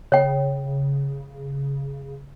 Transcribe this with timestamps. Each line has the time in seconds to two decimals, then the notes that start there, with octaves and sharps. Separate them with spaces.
0.12 C#3 C#5 G5